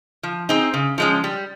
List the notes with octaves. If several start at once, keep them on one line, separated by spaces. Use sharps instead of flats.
F3
C4 D#4 G#4
C#3
F3 G#3 C#4
G3